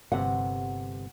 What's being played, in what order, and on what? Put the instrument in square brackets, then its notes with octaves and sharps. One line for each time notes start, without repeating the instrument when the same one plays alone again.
[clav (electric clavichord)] G1 C3 [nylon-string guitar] F#5